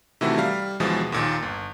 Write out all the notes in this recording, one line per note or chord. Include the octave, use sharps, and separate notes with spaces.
C3 D#3 E3 A3 E4 F#4
G3 F5
D#2 B2 E3 F3 G#3 A6
D#2 A#2 D#3
G1